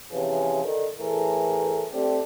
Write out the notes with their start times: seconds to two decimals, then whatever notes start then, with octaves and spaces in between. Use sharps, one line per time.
0.11 C3 E3 F3 C#4 G#4
0.63 D3 D#3
0.98 A2 E3 A3 G#4 A#4
1.92 A3 C4 D4 G4